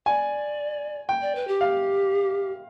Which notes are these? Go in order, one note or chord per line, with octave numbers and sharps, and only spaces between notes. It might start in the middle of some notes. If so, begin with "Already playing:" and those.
D5 G#5
G5
D5
B4
G4
F5